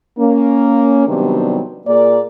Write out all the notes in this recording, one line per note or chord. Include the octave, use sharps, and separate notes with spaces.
A#3 C#4
C3 D#3 F#3 G3 B3 D4
A#2 A#3 G#4 A#4 D5